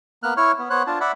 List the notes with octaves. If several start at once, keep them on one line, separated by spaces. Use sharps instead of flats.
A#3 B3 F6 F#6
E4 C#5 C#6 F6
B3
B3 C5 C#5 F#6
D4 F4 A5
D5 E5 F#5 B5